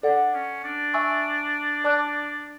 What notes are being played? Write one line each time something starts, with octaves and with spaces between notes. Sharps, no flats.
D4 A4 D5 F#5
C#4
D4
E5 G#5 C#6 E6
D5 A5 D6 F#6